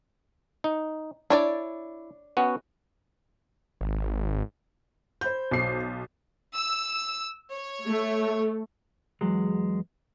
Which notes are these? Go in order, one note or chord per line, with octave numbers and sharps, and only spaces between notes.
D#4
D4 E4 C#5 D5
B3 C#4 F#4
G#1
C5 B5 G6
B1 C7
E6
C#5
A3
E2 F#3 G#3